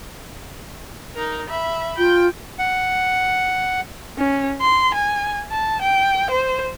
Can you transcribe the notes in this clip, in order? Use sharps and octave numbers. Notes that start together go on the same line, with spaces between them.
D#4 A#4
E5 B5
F4 G5
F#5
C#4
C6
G#5
A5
G5
C5